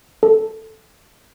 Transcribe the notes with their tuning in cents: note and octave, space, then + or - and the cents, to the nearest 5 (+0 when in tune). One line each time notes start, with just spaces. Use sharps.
A4 +0